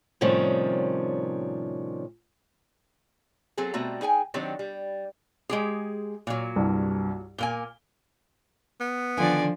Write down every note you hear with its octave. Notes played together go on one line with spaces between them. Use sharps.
A2 C3 D#3 F3 G3 C#4
F#3 C4 G#4 A4
B2 G3 A3 C4 F#4 A#5
D#4 G#4 G5 G#5
D#3 F#3 C4 D4 G4 C#5
G3
G#3 G4 G#4
A#2 F#3
C2 G2
A#2 A#3 G#5 G7
B3
D3 D#3 F3 D4 F4 D5 G#5